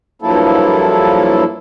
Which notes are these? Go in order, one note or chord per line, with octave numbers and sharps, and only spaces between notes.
G2 F3 F#3 A#3 E4 A4